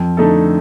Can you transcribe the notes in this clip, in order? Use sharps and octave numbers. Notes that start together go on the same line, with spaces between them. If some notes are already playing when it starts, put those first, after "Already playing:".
Already playing: F2
D3 A3 D#4 A4